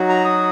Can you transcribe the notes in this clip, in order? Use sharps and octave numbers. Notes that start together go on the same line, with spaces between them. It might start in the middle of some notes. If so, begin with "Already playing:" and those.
Already playing: F#3 D#4 F#4
A#5
D#6